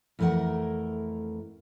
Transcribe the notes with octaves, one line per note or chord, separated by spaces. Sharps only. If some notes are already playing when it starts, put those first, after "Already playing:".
F2 E3 A3 B3 A#4 F#5